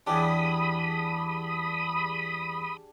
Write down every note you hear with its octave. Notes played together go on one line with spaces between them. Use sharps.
E2 G3 D4 G4 G#4 B5 D#6